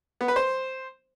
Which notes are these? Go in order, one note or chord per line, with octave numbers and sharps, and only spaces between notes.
B3
B4
C5